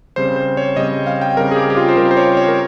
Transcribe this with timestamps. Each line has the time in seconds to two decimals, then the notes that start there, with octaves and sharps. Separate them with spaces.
0.16 C#3 G3 C4 C5
0.36 C5
0.57 C#5
0.76 C#3 G3 C4 D#5
1.07 F5
1.21 G5
1.36 C#3 G3 C4 A#4
1.51 G#4
1.56 G4
1.70 G4
1.77 F4
1.89 C5
1.97 C#3 G3 C4 A#4
2.11 C5
2.17 C#5
2.37 C#5
2.48 A#4